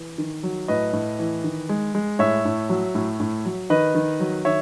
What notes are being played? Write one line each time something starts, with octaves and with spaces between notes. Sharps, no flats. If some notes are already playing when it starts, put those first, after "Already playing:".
Already playing: E3
D#3
F#3
A2 B4 D#5
A2
E3
D#3
G#3
G#3
A2 C#5 E5
A2
F#3
A2
A2
F#3
D#3 B4 D#5
D#3
F#3
D#3 C#5 E5